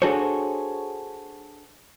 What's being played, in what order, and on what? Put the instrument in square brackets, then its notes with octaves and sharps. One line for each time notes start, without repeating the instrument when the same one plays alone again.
[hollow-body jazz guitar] D4 F#4 G#4 A4 C5 C#5